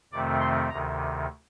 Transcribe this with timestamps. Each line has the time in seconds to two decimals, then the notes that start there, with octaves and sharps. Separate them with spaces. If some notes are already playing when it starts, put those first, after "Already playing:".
0.12 F2 C3 D#3 A3 C4 D5
0.40 C6
0.69 D2 C3 D#3 A#5